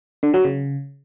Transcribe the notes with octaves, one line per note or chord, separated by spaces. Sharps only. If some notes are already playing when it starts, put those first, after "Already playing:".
D3
F#3
C#3